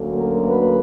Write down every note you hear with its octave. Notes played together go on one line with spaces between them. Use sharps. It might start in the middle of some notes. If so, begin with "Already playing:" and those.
Already playing: D2 D3 F#3 A#3 C#4
A#4
B4